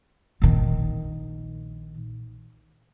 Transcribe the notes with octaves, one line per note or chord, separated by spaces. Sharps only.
A#1 D#3